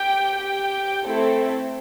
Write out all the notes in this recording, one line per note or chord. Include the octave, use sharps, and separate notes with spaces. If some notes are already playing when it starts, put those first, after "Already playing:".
Already playing: G4 G5
G4 G5
A3 C4 E4 A4